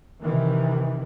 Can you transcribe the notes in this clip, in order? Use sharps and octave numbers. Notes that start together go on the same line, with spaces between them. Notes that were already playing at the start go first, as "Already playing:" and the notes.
C3 D#3 E3